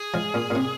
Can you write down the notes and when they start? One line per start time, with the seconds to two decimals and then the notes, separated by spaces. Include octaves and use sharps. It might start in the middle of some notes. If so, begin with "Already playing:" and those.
Already playing: G#4
0.14 F3 G#3
0.34 A#2
0.50 A#2
0.55 C3